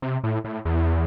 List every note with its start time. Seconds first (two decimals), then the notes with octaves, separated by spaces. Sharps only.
0.02 C3
0.24 A2
0.44 A2
0.65 E2